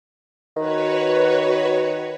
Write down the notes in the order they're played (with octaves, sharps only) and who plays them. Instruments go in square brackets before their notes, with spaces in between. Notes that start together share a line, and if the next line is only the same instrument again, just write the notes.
[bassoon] D#3 [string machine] F#4 B4 C#5